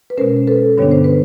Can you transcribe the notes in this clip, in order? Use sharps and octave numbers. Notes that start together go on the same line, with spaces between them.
B4
B2 G#3 C#4 A#4 C5
A4 B4
G2 D3 G3 B3 D4 C#5
C5
B4